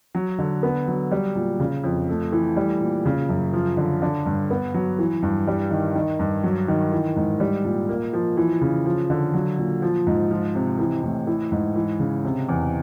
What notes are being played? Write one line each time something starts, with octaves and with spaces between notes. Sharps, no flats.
F#3
D3
B3
F#3
G3
A#2
C#3
F2
A3
E3
G3
A#2
C#3
F#2
F3
D3
D3
G2
B3
F#3
E3
G2
G3
D#3
D#3
G2
F#3
D#3
E3
G#2
G3
A#2
A#3
F3
E3
C#3
F3
D3
F#3
A#2
F3
G#2
F3
C3
E3
A2
E3
G#2
E3
C#3
C3
E2